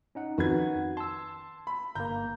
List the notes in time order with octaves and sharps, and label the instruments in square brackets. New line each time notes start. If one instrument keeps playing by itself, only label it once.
[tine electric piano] C#4 D#4 F#5
[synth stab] F2 D#3 [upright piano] F#4 B4 G#6
[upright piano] A5 [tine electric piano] C6 E6
[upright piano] B5
[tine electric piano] G1 A#3 [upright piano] A#5 G6